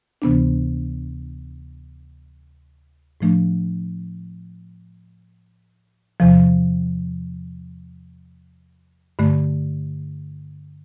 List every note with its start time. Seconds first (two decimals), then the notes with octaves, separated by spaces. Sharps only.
0.22 D2 C3 E3 B3 D4
3.21 A2 F3 A3 D4
6.20 E2 C3 F3
9.19 G2 D3 A3